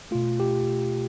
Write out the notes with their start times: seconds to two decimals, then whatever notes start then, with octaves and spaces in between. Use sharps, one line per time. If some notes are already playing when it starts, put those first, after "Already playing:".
0.11 B2 A3 F4
0.40 G4